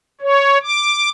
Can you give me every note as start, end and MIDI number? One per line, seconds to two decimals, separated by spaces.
0.21 0.58 73
0.63 1.10 86